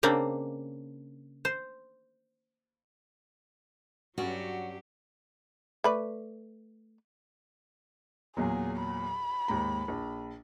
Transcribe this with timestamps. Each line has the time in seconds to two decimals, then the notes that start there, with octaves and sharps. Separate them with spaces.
0.03 C#3 A#3 C4 D4
1.45 C5
4.18 G2 F#3 C#4 F#4 G4 D5
5.84 A3 B4 D5
8.37 E2 A#2 F#3 G#4
8.79 B5
9.48 D#2 G#2 A#5
9.88 A#1